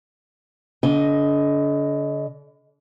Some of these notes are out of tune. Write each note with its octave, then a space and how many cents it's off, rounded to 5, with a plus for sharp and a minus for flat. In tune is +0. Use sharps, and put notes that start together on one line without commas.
D3 -40 D#5 +10